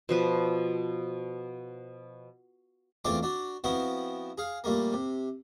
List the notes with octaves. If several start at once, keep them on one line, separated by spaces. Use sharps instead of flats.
B2 F3 B4
E2 A3 C4 D4 F4 D6
D4 F#4
F3 B3 C4 E4 F#4
G#4 F5
A#2 G3 A3 A#3
C3